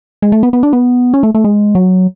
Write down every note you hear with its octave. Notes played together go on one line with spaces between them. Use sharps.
G#3
A3
B3
B3
D4
B3
C#4
A3
A3
G#3
F#3